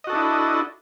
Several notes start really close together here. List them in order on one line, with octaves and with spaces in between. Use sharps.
D#5 F#4 A4 D4 E4